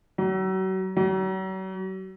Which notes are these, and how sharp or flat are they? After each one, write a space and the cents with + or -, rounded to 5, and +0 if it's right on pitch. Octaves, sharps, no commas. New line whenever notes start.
F#3 +35
F#3 +40